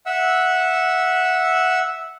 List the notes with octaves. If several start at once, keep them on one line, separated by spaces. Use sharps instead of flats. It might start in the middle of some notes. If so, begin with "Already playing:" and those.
E5 F#5 E6